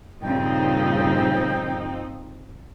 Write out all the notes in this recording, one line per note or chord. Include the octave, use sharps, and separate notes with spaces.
G2 A#2 C#3 F3 C4 D#4 G5